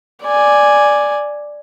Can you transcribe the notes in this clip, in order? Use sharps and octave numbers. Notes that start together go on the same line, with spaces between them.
D5 G#5